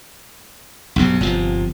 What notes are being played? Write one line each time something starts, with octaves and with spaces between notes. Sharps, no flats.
B1 G2 C3
G1 C3 F3